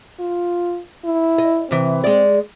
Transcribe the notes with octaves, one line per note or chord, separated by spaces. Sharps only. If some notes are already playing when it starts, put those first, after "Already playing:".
F4
E4
D#5
C3 E3 C4
G#3 D5